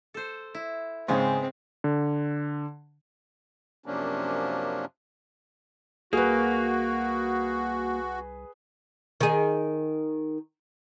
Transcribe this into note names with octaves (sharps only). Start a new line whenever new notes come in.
A4 C5
E4
G#2 C#3 G#3 B3 C4
D3
F#2 C3 F3 A#3 C#4 D4
C2 A#3 F#4 G#4 B4
D#3 G#4